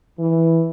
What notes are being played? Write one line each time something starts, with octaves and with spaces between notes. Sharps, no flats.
E3